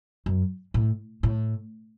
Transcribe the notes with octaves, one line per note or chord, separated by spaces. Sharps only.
F#2
A2
A2